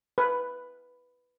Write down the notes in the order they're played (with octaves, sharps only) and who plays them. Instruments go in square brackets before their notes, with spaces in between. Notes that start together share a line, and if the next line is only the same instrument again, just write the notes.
[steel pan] B4